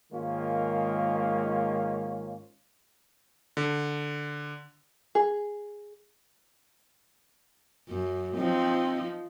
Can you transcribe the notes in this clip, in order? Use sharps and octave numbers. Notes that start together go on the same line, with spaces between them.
G#2 D#3 G#3 A#3 C#4 F4
D3
G#4
F#2
F3 C4 D#4